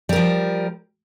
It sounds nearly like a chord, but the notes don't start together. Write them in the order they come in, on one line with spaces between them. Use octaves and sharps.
G3 A#4 F3